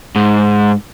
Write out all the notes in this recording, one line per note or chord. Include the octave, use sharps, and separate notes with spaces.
G#2